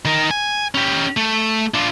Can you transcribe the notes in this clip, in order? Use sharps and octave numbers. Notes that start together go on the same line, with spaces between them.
D#3 A#4
G#5
C#4 G4
A3
D4 F4